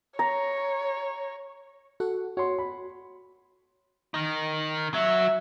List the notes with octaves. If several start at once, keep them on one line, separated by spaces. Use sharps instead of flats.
C#5 A#5
F#4 A4 F#5
F#4 C#5 C6
B5
D#3 D#4
F#3 E5